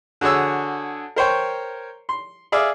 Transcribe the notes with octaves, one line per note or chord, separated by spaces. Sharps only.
D3 F#4 G#4 C#5 E6
A#4 C5 C#5 G5
C6
G#4 D5 E5 F5